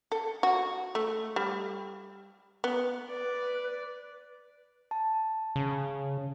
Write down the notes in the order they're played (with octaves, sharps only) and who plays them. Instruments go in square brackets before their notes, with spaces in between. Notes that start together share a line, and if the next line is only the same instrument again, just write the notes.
[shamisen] A4
F#4
A3
G3
B3
[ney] B4 [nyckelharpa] D5
[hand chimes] A5
[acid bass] C#3